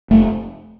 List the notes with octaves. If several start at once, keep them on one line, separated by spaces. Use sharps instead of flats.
F1 A3